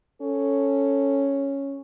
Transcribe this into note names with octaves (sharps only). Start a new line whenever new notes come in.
C#4 A4